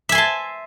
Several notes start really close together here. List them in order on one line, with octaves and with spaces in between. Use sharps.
E5 G#5 C6 A5